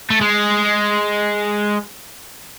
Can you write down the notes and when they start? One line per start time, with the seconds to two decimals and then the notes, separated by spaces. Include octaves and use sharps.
0.10 A3
0.21 G#3